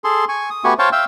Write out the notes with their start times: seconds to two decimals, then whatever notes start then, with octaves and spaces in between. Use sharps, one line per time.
0.04 G#4 A4 C6
0.29 G#5 C#6
0.50 D#6
0.64 A3 B3 F#4 G4 G#5 C#6
0.79 C5 C#5 F5 G5 A5 C#6
0.92 E5 F5 G5 E6